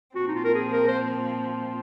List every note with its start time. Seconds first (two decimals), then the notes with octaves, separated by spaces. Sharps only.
0.15 A#2 F3 C4 F#4
0.28 D#4
0.35 F4
0.45 A#4
0.55 G#4
0.73 A#4
0.88 C5